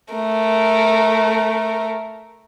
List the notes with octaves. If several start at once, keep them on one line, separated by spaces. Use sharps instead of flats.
A3 A#4